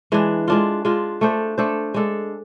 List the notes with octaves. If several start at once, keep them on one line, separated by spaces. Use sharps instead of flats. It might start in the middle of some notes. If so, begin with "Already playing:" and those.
E3 G#3 D4
G#3 D4 F4
G#3 D4 F4
A3 D4 A4 C5
A3 D4 A4 C5
G#3 D4 A4